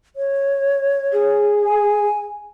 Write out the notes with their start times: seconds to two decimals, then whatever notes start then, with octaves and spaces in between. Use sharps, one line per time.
0.16 C#5
1.13 G#4
1.63 G#5